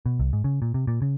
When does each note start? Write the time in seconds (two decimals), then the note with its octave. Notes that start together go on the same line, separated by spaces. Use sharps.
0.06 B2
0.19 C2
0.33 G#2
0.44 C#3
0.62 A#2
0.74 C3
0.87 A#2
1.02 C#3